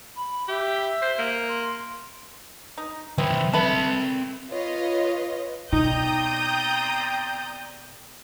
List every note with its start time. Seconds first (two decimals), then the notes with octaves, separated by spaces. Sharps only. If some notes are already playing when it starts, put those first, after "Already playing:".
0.16 B5
0.48 G4 E5
1.02 C5
1.18 A#3
1.49 C6
2.78 D#4
3.18 D#3 F#3 B3 C4 E4
3.53 C4 A4 B4 E5 B5
4.51 F4 B4 C#5 D#5
5.72 B2 C4 D#4 D5 G5 A#5 D#6 G6